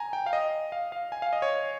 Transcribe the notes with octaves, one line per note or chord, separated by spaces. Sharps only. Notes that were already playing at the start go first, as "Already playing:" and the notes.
Already playing: G#5 A#5
G5
F5
D#5
F5
F5
G#5
F5
D#5
C#5